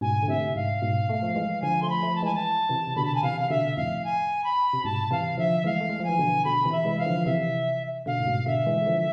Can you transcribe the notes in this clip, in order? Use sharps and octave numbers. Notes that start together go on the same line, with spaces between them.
G#2 B2 G#5
D3
A2 C3 E5
G#2 F5
G#2 B2
A3
F3 A3
E3 G#3
D3 F3 G#5
F3 A3 C6
B5
F3 A3
A5
E3 G#3 G#5
A5
C3 E3
C3
B2 D3 B5
A5
G#5
C3 E3 F5
C3 F5
B2 D3 E5
F2 A2 F5
G#5
B5
C3
G#2 B2 A5
C3 E3 F5
D3 F3 E5
E3 G#3 F5
A3
G#3
F3
E3 G#5
B2 D3
B2 D3 B5
C3 E3
E5
E3 G#3
E3 F5
D3 F3
F3
C3 E3 E5
B2 D3 F5
A2
G#2 B2
B2 D3 E5
E3 G#3
G#3
D3 F3